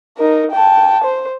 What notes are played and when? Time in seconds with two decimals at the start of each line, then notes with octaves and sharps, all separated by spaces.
0.17 D#4 A#4
0.51 G5 A5
1.04 C5